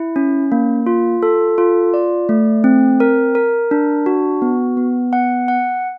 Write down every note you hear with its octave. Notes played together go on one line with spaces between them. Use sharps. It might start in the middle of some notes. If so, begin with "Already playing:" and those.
Already playing: E4
C#4
A#3
F4
A4
F4
D5
A3
C4
A#4
A#4
D4
F#4
B3
B3
F#5
F#5